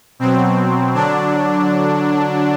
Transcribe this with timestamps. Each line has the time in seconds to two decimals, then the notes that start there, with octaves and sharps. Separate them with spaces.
0.19 B2 F#3 C4
0.94 D3 F#3 D4